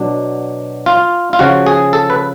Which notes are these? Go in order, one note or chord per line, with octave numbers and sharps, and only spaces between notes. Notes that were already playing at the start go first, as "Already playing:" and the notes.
Already playing: B2 F#3 D4
F4
F4
C#3 F3 F#4
G#4
A4
B4